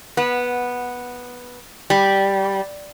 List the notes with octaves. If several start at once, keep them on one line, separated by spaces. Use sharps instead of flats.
B3
G3